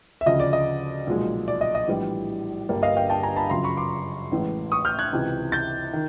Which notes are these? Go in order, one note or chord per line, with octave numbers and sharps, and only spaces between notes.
E5
D2 C#3 F3 D#5
D5
D#5
B1 A#2 F3 G#3
D5
D#5
D#5
A#1 A2 E3 G3
G1 G2 D3 G3 A#3
D#5 F5
F5 G5
G5 A5
G#5 A#5
A5 B5
F#2 C#3 F3 A#5 C6
B5 C#6
C6 D6
A1 A2 E3 G#3
C#6 D#6
F6 G6
F#6 G#6
C#2 C3 E3
G6 A6
D#3